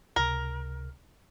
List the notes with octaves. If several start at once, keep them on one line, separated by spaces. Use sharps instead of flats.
C#2 C3 A#4